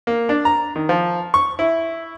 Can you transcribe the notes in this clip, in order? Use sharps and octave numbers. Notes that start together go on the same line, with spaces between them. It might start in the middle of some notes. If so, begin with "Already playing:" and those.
A#3
D4
A#5
D#3
F3
C#6
E4